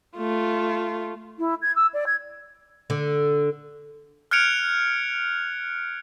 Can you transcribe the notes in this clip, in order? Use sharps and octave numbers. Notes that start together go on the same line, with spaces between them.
A3 F4
E4
G#6
E6
D5
G#6
D3
F6 F#6 G#6 C#7 D7 F7